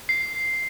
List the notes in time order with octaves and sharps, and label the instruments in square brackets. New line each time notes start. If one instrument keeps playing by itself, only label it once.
[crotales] C7